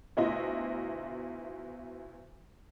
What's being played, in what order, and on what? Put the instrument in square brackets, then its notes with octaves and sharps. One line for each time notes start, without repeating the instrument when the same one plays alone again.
[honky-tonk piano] D2 B2 E4 F4 D#5